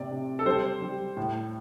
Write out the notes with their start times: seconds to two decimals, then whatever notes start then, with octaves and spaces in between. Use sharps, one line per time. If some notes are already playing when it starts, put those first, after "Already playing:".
Already playing: A2 C3 D5
0.11 C3
0.39 A4
0.46 G3 C5
0.82 G3
1.17 A2